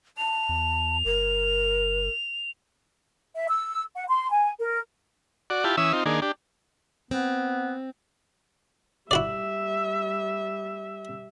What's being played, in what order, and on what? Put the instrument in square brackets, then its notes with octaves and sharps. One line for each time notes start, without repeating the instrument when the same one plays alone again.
[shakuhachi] A5 [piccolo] F7
[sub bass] E2
[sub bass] G1 [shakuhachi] A#4
[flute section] E5
E6
F#5
C6
G#5
A#4
[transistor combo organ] F#4 D5
E4 F4 G4 A5
E3 C#4 E5 D#6 E6
C4 D#4 F4
D#3 A#3 D4 G#4
D4 G4
[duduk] B3 [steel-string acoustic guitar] C4
[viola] G3 E5 [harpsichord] E4 F#4 D5